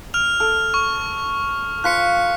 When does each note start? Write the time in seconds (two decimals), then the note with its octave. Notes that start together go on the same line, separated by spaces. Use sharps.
0.14 F6 F7
0.40 A4 F6
0.74 C#6
1.84 F3 C6 F#6 B6 C#7